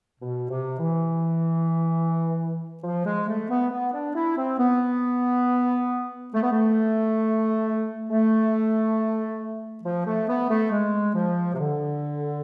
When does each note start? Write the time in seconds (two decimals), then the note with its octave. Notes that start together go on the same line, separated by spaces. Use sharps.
0.21 B2
0.50 C3
0.80 E3
2.83 F3
3.06 G#3
3.27 A3
3.50 B3
3.71 B3
3.93 D4
4.15 E4
4.37 C4
4.59 B3
6.34 A3
6.43 B3
6.52 A3
8.09 A3
9.84 F3
10.06 A3
10.28 B3
10.50 A3
10.72 G#3
11.15 F3
11.54 C3
11.59 D3